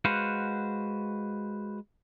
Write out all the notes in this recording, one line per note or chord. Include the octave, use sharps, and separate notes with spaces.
G#3 F#4 B4 C5 F5 F#5